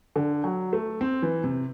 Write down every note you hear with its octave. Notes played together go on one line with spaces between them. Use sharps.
D3
F#3
A3
C4
E3
C3